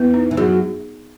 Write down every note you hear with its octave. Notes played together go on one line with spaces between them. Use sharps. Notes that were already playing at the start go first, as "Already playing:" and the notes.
Already playing: E2 E3 B3
D#4
E3
F#2 F#3 G#4